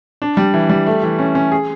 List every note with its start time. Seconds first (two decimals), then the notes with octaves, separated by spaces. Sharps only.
0.22 D4
0.37 G3
0.54 E3
0.69 G3
0.86 A3
1.03 E3
1.19 C#4
1.35 C#4
1.52 G#4